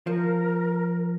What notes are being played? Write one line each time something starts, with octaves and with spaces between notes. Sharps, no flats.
F3 A#4